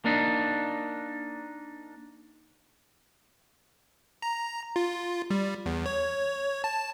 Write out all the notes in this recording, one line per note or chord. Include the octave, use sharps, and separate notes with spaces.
A#3 D4 D#4
A#5
F4
G3
E2
C#5
A5